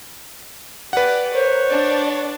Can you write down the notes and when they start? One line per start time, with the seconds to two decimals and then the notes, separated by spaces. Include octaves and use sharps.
0.93 G4 B4 D5 F#5
1.34 A#4 C5 C#5
1.66 D4 D5